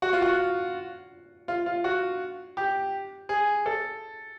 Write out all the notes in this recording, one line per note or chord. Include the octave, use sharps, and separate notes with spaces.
F#4
F4
F#4
F4
F4
F#4
G4
G#4
A4